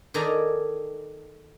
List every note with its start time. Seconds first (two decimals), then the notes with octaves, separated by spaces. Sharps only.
0.14 D#3 G#4 A4 D5 A#5